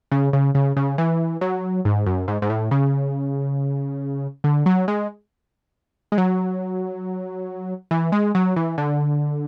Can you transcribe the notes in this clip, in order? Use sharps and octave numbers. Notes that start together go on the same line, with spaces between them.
C#3
C#3
C#3
C#3
E3
F#3
G#2
F#2
G#2
G#2
A2
C#3
D3
F#3
G#3
G#3
F#3
E3
G#3
F#3
E3
D3